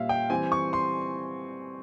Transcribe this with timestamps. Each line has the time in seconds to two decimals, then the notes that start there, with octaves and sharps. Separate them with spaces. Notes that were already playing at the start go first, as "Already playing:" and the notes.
Already playing: A#2 G3 C#4 E5 F5
0.09 G5
0.30 E3 G3 C4 G#5
0.52 C#6
0.73 C6